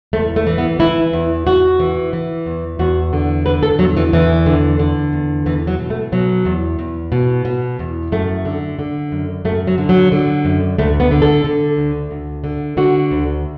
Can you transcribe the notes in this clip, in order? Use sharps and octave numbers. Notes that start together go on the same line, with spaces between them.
E2 A3
A3
E3
B3
E3 E4
E2
E2 F#4
E3
E3
E2
E2 F#4
D3
D3 B4
A4
E2 F#3
E3
E2 E3
D3
D3
E2
E2 E3
F#3
B2
A3
B2 F#3
E2
E2
B2
B2
E2
F#2 A3
D3
D3
F#2
F#2 A3
F#3
D3
F#3
D3
F#2
D2 A3
B3
D3
A4
D3
D2
D2
D3
D3 F#4
D2